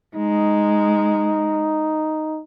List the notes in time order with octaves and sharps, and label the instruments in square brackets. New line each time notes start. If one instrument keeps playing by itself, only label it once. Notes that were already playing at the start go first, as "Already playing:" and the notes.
[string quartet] G#3 [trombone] D#4